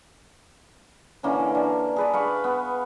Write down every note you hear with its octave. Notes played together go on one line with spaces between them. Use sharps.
D3 E3 A#3 C#4
D4
G#4 B4 D5
F5 B5 C#6
B3